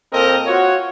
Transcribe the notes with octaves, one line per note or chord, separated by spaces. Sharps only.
A#2 A#3 C4 A4 A#4 D#5
F4 F#4 C#5